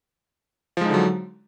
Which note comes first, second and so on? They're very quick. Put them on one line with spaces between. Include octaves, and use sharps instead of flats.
F3 G#3 D#4 D3 F#3